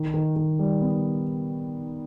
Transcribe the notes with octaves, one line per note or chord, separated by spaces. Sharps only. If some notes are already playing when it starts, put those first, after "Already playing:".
Already playing: D#3
D#3
D#3
G3
B3